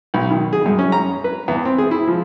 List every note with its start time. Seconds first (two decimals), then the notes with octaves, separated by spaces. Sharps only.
0.14 B1
0.31 D#3
0.53 G#4
0.66 F#2
0.79 C#4
0.92 A#5
1.24 B4
1.48 E2
1.65 C4
1.78 G#4
1.91 E4
2.07 F3